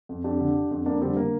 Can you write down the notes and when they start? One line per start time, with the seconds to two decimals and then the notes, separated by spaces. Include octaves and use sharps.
0.09 F2
0.24 F2 D4 G4
0.40 D3
0.55 D3
0.71 F2
0.86 F2 A#3 D4
1.01 D3 G3 C4
1.17 D3 A#3